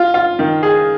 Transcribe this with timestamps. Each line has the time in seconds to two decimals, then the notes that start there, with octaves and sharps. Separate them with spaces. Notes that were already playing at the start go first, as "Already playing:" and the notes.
Already playing: F4
0.14 F4
0.39 D#3
0.63 G#4